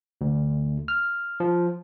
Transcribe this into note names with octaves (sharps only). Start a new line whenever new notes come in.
D2
F6
F3